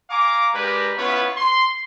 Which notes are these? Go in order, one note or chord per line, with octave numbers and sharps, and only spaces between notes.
F5 G#5 A#5 D6
G#3 D4 G4 A#4 B4
B3 C#4 E4 F4 B4 C#5
C6